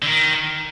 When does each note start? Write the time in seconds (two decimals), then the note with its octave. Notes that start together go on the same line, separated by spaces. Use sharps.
0.02 D3
0.07 D#3